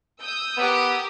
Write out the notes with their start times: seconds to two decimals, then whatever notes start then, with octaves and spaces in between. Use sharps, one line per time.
0.22 D#6 E6 G6
0.57 B3 G4 A#4